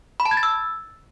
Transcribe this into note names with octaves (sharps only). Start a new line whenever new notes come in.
B5
A5
G#6
A6
E6